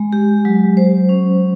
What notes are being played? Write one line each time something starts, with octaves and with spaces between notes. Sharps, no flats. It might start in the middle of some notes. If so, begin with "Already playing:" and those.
Already playing: G#3
G4
F#3
C5
C#4